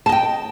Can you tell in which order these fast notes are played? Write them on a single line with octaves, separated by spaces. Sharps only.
A5 D#5 G5